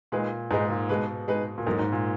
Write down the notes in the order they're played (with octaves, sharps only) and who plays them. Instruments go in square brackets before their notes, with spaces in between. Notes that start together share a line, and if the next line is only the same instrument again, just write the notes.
[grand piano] A#2 [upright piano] G#3 D#4 G#4 B4
[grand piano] G#2 [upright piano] G#3 D#4 G#4 B4
[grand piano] A#2
[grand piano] B2 [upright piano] G#3 D#4 G#4 B4
[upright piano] G#3 D#4 G#4 B4
[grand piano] A#2
[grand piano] G#2 [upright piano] F#3 A#3 D#4 A#4
[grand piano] G#2
A#2